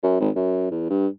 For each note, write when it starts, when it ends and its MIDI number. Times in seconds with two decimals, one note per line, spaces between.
0.03 0.18 42
0.20 0.30 32
0.36 0.71 42
0.71 0.89 40
0.90 1.07 43